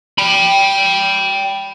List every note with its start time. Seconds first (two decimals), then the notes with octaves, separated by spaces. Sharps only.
0.18 G5 B5